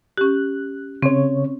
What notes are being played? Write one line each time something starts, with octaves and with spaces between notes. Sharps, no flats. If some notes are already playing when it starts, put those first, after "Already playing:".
C#4 G4 F#6
C#3 C4 C#4 C#5